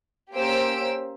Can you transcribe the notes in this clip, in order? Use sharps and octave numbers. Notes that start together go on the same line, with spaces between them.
A#3 C#4 G4 C5 E6 D7